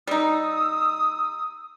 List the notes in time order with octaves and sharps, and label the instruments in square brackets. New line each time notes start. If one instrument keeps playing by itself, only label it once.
[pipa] G3 D#4 [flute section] D#6 E6